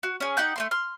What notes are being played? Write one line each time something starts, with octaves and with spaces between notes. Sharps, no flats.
F#4
C#4 G#4
D#4 G4 F#5 G6
A3 A#3 C6
C6 F6